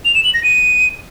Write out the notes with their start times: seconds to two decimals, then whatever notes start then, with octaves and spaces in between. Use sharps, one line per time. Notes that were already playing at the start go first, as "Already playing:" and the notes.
0.05 F7
0.15 E7
0.24 F#7
0.34 A#6
0.44 D#7